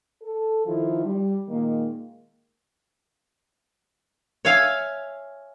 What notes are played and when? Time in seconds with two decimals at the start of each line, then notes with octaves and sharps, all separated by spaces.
0.22 A4
0.66 D#3 F3 E4 F4
1.04 G3
1.49 A#2 D#3 G#3 A#3
4.45 C#5 E5 F5 G#5